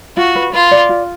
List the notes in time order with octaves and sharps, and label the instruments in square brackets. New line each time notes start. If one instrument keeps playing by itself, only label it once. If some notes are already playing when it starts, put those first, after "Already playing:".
[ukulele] F4 [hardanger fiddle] F#4
[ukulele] B4
[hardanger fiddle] F4 [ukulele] B4
[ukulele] D5
F4